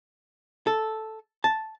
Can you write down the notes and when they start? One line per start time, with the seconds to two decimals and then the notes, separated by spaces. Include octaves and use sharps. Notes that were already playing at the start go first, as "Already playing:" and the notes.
0.67 A4
1.44 A5